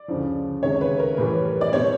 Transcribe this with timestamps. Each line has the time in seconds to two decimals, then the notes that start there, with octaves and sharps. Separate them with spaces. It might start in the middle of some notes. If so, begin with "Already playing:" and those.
Already playing: D5
0.08 D2 C#3 F3
0.62 C#2 C3 D#3 G#3 C#5
0.81 B4
0.99 A#4
1.17 A2 E3 G3 B4
1.61 D5
1.72 B2 G3 C4 C#5